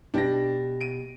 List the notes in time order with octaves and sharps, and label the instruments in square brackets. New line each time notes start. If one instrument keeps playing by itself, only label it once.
[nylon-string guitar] B2 G4 G5 [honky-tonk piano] D4 A#6
[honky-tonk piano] D7 D#7